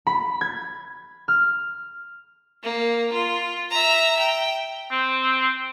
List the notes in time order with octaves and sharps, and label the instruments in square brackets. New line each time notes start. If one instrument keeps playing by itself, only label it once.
[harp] B5
G#6
F6
[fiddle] A#3
F4
E5 A#5
G5
[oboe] C4